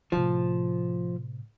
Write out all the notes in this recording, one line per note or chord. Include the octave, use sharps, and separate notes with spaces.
A2 C3 F3